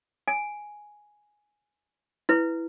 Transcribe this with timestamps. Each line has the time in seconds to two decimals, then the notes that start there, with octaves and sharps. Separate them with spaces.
0.28 G#5
2.29 E4 B4